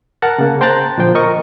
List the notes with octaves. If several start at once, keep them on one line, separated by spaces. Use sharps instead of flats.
A#4 F#5 A5 A#5 F#6
C#3 A#3
C5 G5 A5 A#5 F#6 A6
A#2 D3 F3 C5 G5
A#4 D#5 C#6